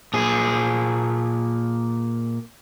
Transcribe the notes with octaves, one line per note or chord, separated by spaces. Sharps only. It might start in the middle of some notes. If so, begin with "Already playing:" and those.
A#2 G#4